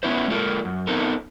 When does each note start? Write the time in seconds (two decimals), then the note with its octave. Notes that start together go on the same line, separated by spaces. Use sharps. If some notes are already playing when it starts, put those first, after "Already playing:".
0.03 B3 C#4 E4 B4 C5
0.28 G#3 A#3 F4 A4 A#4
0.65 F#2
0.87 B3 C4 D#4 A4 A#4